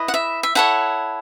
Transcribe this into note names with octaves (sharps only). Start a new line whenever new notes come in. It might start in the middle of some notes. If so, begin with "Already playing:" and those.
Already playing: E4 B4 D#5
F#5
E5
E5
E4 A4 C#5 F#5